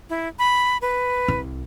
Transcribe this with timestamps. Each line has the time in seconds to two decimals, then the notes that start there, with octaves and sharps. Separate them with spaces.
0.10 E4
0.39 B5
0.82 B4
1.28 C2